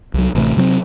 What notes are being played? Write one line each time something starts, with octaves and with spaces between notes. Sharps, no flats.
C2 F#3
A1 C3 A3
C3 F#3 A#3 C4